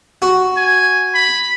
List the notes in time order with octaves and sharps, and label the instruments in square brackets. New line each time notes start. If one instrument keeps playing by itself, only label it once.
[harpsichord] F#4
[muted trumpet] G#5
B5